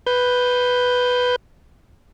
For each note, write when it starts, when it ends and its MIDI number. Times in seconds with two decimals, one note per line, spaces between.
0.07 1.36 71
0.07 1.36 91